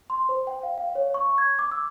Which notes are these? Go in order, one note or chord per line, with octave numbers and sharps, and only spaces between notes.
C6
C5
G5
F5
F5
C#5
C#6
G#6
D6
E6